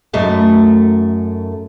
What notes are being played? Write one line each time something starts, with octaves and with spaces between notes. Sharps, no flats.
F#2 A3 D#4